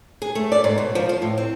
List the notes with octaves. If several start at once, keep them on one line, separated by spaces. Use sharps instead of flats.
G#4
A3
D5
G#2
B2
F3
F4
A2
C4